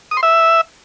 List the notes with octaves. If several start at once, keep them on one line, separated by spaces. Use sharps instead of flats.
D#6
C6
E5